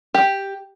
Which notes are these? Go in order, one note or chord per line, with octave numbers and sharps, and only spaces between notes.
G4